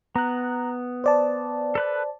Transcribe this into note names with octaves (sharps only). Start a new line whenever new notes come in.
B3 A#5 F#6
C5 D5 A5
A4 B4 F#6